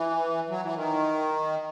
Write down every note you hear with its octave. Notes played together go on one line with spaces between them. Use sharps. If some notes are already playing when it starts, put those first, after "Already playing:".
Already playing: E3
F#3
E3
D#3